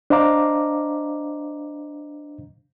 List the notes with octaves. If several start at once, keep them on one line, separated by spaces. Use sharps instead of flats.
D4 C5 D#5 F5 A#5 D6